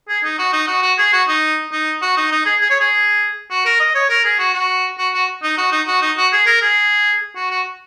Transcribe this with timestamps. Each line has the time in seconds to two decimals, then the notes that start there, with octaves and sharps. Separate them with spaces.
0.09 G#4
0.24 D#4
0.39 F#4
0.53 D#4
0.67 F#4
0.82 F#4
0.98 G#4
1.13 F#4
1.28 D#4
1.72 D#4
2.02 F#4
2.17 D#4
2.31 D#4
2.45 G#4
2.61 G#4
2.70 C#5
2.80 G#4
3.50 F#4
3.65 A#4
3.80 D#5
3.95 C#5
4.09 A#4
4.25 G#4
4.39 F#4
4.54 F#4
4.98 F#4
5.14 F#4
5.43 D#4
5.58 F#4
5.72 D#4
5.87 F#4
6.02 D#4
6.17 F#4
6.32 G#4
6.46 A#4
6.62 G#4
7.36 F#4
7.51 F#4